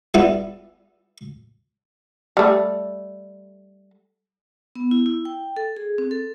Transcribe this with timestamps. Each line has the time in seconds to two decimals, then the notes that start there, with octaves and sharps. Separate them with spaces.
0.14 G3 B3 E4
2.37 G3 A3
4.75 B3
4.91 E4
5.06 E4
5.25 G5
5.57 A4
5.77 G#4
5.98 C4
6.11 A4